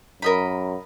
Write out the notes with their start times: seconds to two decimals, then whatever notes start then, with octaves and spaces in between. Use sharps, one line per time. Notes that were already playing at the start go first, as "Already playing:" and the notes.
0.22 F#2 A#4 D#5 B5